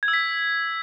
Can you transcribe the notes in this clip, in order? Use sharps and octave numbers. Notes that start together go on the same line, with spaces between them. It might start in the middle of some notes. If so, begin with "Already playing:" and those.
G#6
E6
B6